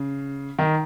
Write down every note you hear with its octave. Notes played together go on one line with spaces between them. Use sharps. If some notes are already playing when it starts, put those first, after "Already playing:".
Already playing: C#3
D#3